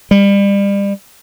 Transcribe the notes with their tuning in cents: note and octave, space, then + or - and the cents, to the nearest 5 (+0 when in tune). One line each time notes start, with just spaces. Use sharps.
G3 +30